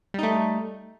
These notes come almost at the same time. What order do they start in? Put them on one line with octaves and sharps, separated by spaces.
G3 D#4 A3